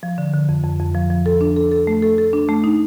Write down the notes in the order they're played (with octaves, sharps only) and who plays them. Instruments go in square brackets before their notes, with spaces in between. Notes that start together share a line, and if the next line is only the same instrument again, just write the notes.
[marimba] F3
D3
D3
F2
F2
F2
F3
F3
A4
D4
A4
A4
A3
A4
A4
D4
A3
D#4